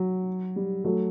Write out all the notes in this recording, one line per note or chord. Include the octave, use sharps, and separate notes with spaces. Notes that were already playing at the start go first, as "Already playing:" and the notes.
Already playing: F#3
G3
F#3 A3